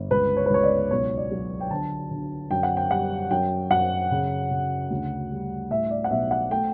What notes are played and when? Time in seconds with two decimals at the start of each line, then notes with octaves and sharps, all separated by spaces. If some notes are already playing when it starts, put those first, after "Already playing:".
Already playing: G1
0.11 C#2 B4
0.37 C#5
0.46 B4
0.50 C#2 C#5
0.63 D5
0.91 B1 C#5
1.17 D5
1.31 F#3
1.61 G5
1.71 D3 A5
2.11 D3
2.51 F#2 G5
2.63 F#5
2.77 G5
2.91 G3 F#5
3.31 F#2 G5
3.71 F#2 F#5
4.11 C#3
4.51 C#3
4.90 D2
5.31 G3
5.70 A2 E5
5.91 D5
6.04 F#5
6.11 B1 E5
6.31 F#5
6.51 A3 G5